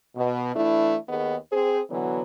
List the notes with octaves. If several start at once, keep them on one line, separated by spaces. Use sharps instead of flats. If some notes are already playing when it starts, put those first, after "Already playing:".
B2
E3 A3 D4 E4
D#2 D#3 B3 G#4 D#5
C4 G#4 C5
B2 D3 E3 F#3 B3